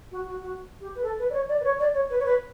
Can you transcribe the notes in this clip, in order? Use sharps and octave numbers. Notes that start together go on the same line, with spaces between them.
F#4
F#4
F#4
G4
B4
A4
B4
D5
C#5
D5
B4
C#5
D5
C#5
B4
C#5
B4